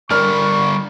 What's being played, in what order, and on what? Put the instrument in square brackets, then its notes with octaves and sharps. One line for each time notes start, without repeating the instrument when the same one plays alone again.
[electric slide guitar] D3 G3 D5 [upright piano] A#4 F6 [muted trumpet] C#6